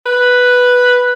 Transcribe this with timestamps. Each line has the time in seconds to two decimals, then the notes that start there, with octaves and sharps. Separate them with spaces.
0.06 B4